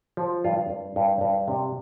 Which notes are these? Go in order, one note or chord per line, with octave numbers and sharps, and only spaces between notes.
F3
G2 F4
G2
G2
G2
C3